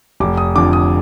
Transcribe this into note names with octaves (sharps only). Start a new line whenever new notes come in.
F1 D6
D#6
F2 D3 D6
D#6